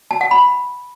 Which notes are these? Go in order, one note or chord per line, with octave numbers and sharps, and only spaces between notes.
A5
F#5
B5